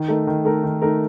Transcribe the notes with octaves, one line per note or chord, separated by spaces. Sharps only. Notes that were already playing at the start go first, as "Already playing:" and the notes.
Already playing: D#3
A3 D#4 A#4
D#3
A3 D#4 A#4
D#3
A3 D#4 A#4